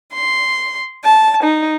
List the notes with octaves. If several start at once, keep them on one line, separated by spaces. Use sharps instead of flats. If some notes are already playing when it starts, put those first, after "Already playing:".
C6
A5
D#4